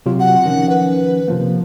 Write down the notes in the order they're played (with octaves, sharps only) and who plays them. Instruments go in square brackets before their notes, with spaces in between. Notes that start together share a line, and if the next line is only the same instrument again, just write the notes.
[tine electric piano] C3 F#3 F4
[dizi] F#5
[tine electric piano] D#3 F3 C#4
[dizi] B4
[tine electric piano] C3 F3 A#3